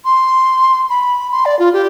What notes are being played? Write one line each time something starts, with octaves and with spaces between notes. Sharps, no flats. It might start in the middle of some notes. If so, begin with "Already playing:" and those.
C6
B5
C6
D5
F4
G4